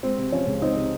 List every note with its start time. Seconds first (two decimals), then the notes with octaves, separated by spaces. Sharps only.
0.03 G#3 C4
0.18 C3
0.32 F3 C#4
0.47 C#2
0.61 G#3 C4 D#4
0.76 C3